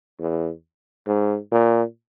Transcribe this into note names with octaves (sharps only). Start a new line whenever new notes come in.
E2
G#2
A#2